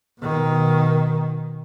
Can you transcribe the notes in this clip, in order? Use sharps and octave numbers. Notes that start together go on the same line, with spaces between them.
B2 D#3